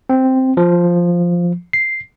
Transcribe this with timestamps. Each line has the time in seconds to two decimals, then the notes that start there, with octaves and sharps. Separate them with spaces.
0.09 C4
0.57 F3
1.73 C7